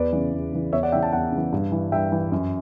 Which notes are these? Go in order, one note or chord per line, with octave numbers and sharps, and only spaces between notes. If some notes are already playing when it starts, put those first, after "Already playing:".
Already playing: E2 B4 D5
C#3 E3
E2
C#3 E3
E2 C#5 E5
D5 F#5
C#3 E3 E5 G5
F#5 A5
E2 F#5 A5
C#3
E3
G2
E3
G2 E5 G5
E3
F#2